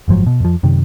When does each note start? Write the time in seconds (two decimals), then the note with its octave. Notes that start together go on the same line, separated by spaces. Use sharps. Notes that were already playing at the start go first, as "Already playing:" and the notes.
0.08 F#1 G#2 F3 F#3
0.26 B2
0.40 F2 F3
0.63 F#2 C3 D#3